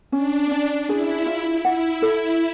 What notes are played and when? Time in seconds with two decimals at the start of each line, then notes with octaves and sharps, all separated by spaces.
0.12 C#4 D4
0.51 C#4
0.89 E4 G#4
1.26 F4
1.65 E4 F#5
2.02 A4